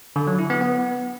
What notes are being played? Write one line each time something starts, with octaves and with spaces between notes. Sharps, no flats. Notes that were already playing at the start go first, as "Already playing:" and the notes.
D3
F#3
E4
B3
B3